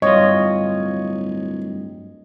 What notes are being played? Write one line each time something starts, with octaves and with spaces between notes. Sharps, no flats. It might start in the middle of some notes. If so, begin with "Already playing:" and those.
D1 G2 F4 C#5 D#5